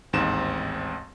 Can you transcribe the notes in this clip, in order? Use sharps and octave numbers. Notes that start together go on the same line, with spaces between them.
A1 D#2 G#2 C4 E7